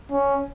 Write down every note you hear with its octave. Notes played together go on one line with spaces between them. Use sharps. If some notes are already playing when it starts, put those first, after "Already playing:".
C#4